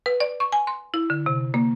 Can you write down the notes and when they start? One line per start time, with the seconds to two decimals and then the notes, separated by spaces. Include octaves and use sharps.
0.06 B4
0.20 D5
0.40 C#6
0.52 G#5
0.67 C6
0.94 E4
1.10 D3
1.26 C3
1.54 A#3